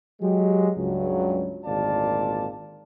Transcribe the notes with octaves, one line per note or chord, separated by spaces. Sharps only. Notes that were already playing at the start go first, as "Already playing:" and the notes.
F#3 G#3 G4
C#2 G2 F#3
G#1 D2 A#2 D5 F5 A5